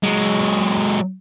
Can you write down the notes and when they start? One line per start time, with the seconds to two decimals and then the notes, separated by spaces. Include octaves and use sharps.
0.03 F#3 G#3